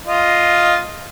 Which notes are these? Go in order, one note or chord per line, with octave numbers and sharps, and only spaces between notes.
F4 D#5